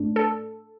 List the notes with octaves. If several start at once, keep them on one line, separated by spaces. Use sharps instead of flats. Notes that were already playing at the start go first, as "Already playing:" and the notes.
Already playing: A2 A3 D4
A4